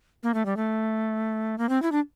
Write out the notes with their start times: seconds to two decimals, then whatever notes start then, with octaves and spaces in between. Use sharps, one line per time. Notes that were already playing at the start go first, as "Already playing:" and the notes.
0.23 A#3
0.34 A3
0.46 G3
0.57 A3
1.58 A#3
1.69 C4
1.82 E4
1.92 D4